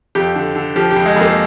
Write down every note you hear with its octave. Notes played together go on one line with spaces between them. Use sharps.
F2 G4
D3
D3
F3 G4
G4
F2
G#3
F2 A#3